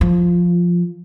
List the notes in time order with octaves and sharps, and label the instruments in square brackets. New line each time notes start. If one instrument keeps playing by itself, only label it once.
[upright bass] F3